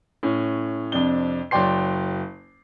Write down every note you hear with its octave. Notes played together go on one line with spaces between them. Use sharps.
A2 C#4
F2 C3 D4 G7
F#1 F#3 D5 G5 C6 C7